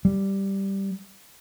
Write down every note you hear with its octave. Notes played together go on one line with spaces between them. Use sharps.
G3